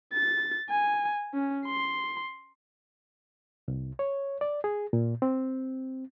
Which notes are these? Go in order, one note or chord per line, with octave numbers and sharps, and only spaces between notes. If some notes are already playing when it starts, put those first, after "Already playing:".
A6
G#5
C#4
C6
C2
C#5
D5
G#4
A#2
C4